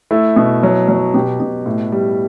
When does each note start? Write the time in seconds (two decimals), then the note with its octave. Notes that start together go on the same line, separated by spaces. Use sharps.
0.11 A3 E4
0.36 B2
0.63 F#3
0.88 F#3
1.14 B2 G4
1.40 B2
1.66 A2
1.92 G3